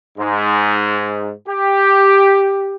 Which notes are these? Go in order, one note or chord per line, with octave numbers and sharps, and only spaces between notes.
G#2
G4